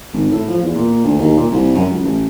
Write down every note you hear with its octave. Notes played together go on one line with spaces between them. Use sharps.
G#1
A2
F3
E2
A#2
D2
D#2
A#2
C2
F#2
C#2
A1